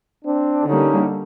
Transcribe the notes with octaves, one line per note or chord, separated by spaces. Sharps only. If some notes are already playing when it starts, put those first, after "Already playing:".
C4 D4
D3 G3 A#3 C#4 D#4